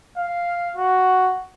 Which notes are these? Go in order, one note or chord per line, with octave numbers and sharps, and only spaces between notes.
F5
F#4